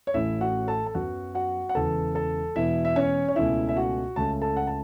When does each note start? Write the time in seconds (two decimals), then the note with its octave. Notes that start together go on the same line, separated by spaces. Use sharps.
0.07 C#5
0.14 A1 A2 A3 C#4 E4 E5
0.41 F#4 F#5
0.68 A4 A5
0.87 A5
0.95 F#2 F#3 B3 F#4 F#5
1.35 F#4 F#5
1.69 F#5
1.75 E1 E2 C#3 E3 B3 A4 A5
2.15 A4 A5
2.56 E1 E2 B2 B3 E4 E5
2.85 E5
2.96 C#4 C#5
3.28 C#5
3.36 C#2 B2 A3 C#4 E4 E5
3.69 E5
3.77 F#4 F#5
4.16 C#2 C#3 A3 C#4 A5
4.42 A4 A5
4.57 F#5
4.67 A5